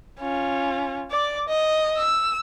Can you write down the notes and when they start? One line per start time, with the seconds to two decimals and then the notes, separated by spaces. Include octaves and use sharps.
0.20 C#4 F4
1.11 D5 D6
1.48 D#5
1.98 E6